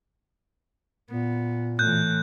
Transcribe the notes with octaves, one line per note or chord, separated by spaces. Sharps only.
A#2 B3
A2 E3 F#6 G6